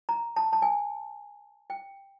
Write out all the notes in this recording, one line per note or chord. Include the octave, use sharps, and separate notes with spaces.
A#5
A5
A5
G#5
G5